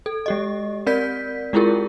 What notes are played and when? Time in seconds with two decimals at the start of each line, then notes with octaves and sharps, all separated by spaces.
0.06 A4
0.26 G#3 G4 D#5
0.87 C4 A#4 D5 G6 B6
1.53 G#3 E4 F4 G4 G#4 A#4